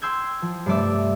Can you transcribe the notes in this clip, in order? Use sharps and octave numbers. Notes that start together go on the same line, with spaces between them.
G5 C6 E6 G6 G#6
F3
G2 C3 A3 D5 E5